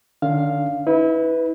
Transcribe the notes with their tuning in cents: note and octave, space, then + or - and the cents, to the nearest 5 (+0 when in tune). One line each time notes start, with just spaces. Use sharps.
D3 +45 D4 -45 F5 +0
E4 -30 B4 +5